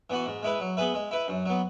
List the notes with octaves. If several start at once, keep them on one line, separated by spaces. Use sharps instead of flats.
E3 B3 F#4
G#2
G#3 E4 B4
F#3
B3 G#4 B4 E5
G#3
E4 B4 E5
F#2
F#3 B3